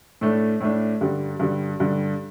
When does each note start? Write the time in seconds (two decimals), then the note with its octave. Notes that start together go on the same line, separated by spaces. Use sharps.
0.21 A2 A3 D4
0.60 A2 A3 D4
1.01 G2 D3 G3
1.39 G2 D3 G3
1.80 G2 D3 G3